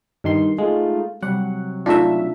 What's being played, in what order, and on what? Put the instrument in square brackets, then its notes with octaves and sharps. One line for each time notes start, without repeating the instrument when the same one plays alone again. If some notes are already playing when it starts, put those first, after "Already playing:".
[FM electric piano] G2 D#3 C6
[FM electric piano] G#3 [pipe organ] A3 D#4 F4
[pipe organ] C3 F#3 [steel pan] G3 [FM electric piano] F#5
[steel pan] A3 D#4 F4 [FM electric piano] D4 E5